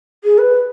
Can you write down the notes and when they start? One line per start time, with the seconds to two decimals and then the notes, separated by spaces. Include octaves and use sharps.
0.24 G#4
0.38 B4